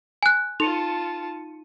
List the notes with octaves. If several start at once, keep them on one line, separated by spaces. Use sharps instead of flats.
G#5 F#6
D#4 F4 A5 C#7 D#7 F7